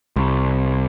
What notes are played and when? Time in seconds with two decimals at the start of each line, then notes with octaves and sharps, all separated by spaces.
0.16 C2